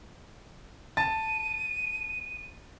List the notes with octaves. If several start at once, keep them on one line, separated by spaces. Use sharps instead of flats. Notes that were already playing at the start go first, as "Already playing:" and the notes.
A5 A6 D#7